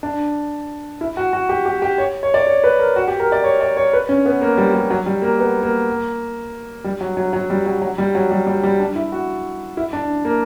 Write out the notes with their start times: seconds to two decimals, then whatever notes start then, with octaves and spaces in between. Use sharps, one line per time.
0.03 D4
1.01 E4
1.17 F#4
1.33 F#4
1.49 G4
1.65 G4
1.82 G4
1.98 C#5
2.23 C#5
2.34 D5
2.47 C#5
2.64 B4
2.79 A#4
2.96 F#4
3.08 G4
3.20 A#4
3.32 D5
3.44 C#5
3.61 D5
3.77 C#5
3.93 B4
4.09 C#4
4.26 B3
4.41 A#3
4.57 G3
4.74 G3
4.90 F#3
5.06 G3
5.22 A#3
5.39 B3
5.63 A#3
6.84 G3
7.01 F#3
7.17 F#3
7.33 F#3
7.50 G3
7.66 F#3
7.82 F#3
7.98 G3
8.15 F#3
8.31 G3
8.47 G3
8.63 G3
8.79 D4
8.96 E4
9.12 F#4
9.77 E4
9.93 D4
10.25 A#3